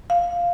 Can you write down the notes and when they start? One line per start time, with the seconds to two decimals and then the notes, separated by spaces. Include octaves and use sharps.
0.10 F5